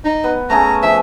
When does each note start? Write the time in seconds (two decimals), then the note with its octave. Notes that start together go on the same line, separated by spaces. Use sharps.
0.05 D#4
0.24 B3
0.50 A3 C#4 G#4 A#5
0.83 F3 E5